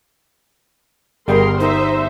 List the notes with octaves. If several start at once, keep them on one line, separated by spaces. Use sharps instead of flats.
G1 G3 G#4 A#4 G5 C6
D#4 C5 E5